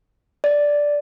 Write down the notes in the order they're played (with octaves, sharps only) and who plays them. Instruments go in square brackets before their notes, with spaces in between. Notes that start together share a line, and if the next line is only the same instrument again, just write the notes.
[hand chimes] D5